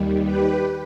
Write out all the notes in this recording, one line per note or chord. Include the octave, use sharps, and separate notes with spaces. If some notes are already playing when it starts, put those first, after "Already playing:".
Already playing: D#2 D#3 G3
G4 B4